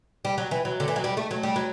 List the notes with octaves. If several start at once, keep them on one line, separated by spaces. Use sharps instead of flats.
G3
F#3
E3
F#3
D3
E3
F#3
G3
A3
F#3
G3
F#3